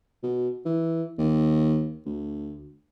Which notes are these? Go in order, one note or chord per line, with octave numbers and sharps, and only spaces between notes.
B2
E3
D#2
D2